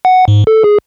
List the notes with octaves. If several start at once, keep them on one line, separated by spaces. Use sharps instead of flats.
F#5
G#2
A4
G#4